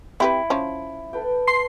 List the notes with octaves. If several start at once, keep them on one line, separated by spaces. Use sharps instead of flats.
C4 E4 G4 B4
F3 C#4
A4 B4 G5
C6 C7